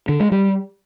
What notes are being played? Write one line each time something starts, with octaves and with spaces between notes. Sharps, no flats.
D3
G#3
G3